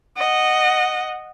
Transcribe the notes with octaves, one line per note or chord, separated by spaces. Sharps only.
D#5 F#5